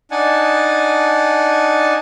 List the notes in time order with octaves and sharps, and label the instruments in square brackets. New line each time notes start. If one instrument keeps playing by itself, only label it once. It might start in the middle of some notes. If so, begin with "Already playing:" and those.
[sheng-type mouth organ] D4 D#4 F#5 G#5 A5